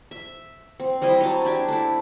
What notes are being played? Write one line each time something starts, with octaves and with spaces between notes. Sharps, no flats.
E5
C4
G3 C4 E4 D#5
F#3 A5
D4 G4 G#5
A3 D4 E4